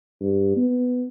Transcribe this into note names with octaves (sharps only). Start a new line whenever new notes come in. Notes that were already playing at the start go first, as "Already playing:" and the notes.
G2
B3